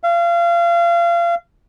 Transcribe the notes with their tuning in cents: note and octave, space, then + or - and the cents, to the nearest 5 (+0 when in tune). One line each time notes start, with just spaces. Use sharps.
F5 -30